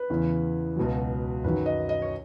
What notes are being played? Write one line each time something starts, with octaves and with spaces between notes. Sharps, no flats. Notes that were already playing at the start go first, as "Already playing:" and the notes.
Already playing: B4
E2 C#3 E3
C#2 B2 F#3
F#2 D#3 F#3 B4
D#5
D#5
C#5